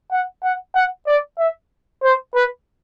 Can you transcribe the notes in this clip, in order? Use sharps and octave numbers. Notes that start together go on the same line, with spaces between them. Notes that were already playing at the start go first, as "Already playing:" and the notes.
F#5
F#5
F#5
D5
E5
C5
B4